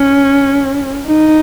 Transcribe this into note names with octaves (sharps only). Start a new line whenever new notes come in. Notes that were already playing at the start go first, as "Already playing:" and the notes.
Already playing: C#4
D#4